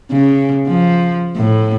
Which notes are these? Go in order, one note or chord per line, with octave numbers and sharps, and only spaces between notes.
C#3
F3
A2